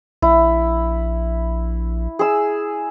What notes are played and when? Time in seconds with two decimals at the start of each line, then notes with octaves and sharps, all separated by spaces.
0.22 A#1 E4
2.19 G#4 E6